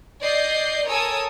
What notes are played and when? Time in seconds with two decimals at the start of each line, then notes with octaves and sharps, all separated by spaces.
0.23 D5 D#5 G6 C7
0.90 A4 A#4 C#5 G#5 D#6 E6